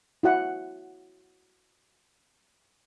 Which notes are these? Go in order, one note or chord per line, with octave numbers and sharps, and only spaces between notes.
E4 F#4 F#5